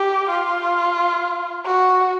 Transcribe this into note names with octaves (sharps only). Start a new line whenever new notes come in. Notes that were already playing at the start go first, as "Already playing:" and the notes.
Already playing: G4
F4
F#4